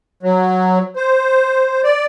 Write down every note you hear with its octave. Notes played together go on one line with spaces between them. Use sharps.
F#3
C5
D5